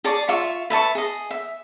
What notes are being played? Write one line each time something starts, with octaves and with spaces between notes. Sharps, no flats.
G#4 D5 A5 C#6
F4 E5 C#6
B4 E5 A5 C#6
G#4 D#5
E5